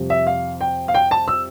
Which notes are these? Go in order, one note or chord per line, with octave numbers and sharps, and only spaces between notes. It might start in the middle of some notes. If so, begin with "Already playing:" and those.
Already playing: F2 C3 G3
E5
F5
G5
F5
G5
A5
E6